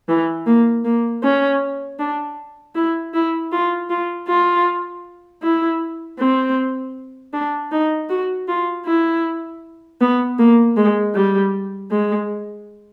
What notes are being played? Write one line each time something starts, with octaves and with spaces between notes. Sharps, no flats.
E3
A#3
A#3
C#4
D4
E4
E4
F4
F4
F4
E4
C4
D4
D#4
F#4
F4
E4
B3
A#3
G#3
G3
G#3